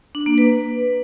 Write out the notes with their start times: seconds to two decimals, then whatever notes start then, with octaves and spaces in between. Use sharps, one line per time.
0.15 D4
0.26 A#3
0.38 B4